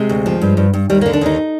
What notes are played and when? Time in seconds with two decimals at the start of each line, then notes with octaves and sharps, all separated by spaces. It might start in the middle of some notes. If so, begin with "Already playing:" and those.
Already playing: C3 G#3
0.09 D2
0.26 F3
0.42 G2
0.57 G2
0.73 G2
0.90 D#2 G3
1.01 A#3
1.06 D3
1.13 D4
1.21 D#2 D#4